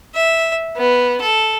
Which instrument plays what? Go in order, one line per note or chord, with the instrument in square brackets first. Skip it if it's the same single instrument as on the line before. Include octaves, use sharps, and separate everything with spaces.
[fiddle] E5
B3
A4